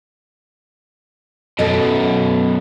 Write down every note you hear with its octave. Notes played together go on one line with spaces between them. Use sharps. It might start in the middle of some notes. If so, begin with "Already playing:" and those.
F#2 B2 A4 D#5